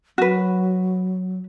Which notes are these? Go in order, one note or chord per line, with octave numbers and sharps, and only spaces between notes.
F#3 F#4 B4